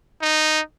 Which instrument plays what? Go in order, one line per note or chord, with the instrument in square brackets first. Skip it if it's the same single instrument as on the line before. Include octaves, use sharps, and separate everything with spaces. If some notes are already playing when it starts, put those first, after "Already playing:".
[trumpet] D#4